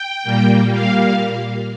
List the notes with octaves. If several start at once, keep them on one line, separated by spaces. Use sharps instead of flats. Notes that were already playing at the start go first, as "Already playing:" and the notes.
Already playing: G5
A#2 G3 A#3
F5